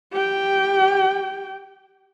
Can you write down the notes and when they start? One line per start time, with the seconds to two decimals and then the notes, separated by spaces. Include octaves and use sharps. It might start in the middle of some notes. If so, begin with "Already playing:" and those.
0.13 G4 G5